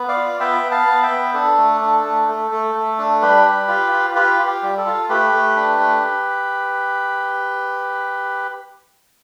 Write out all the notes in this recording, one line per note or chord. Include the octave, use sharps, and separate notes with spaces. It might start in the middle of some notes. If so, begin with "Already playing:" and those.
Already playing: B3
D5 F5
F4
B3 E5 G5
B3
F5 A5
B3
E5 G5
B3
D4 A4
A3
D4
A3
A3
A3
A3
D4
G3 G4 B4
G3
F4
F4
F4 G4 B4
F4
G4
G3
A4
F4
A3 G4 B4
A3
D4
A3